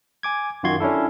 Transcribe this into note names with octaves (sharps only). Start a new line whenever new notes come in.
G#5 D6 G#6
F#2 D#3 F4 F#4 C6 G#6
C#4 D4 E4 A4